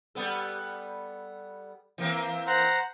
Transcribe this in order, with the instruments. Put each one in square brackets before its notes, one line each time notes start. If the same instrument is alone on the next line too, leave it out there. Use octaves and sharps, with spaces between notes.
[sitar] G3 B3 A4
E3 A#3 C4
[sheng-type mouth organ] C5 F#5 A#5